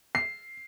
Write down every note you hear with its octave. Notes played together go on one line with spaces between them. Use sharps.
C7